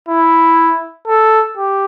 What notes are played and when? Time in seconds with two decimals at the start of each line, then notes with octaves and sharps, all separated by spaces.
0.08 E4
1.07 A4
1.57 G4